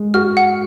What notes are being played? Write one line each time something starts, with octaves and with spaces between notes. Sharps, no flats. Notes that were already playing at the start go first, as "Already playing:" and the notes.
Already playing: G#3
F#4 F6
F#5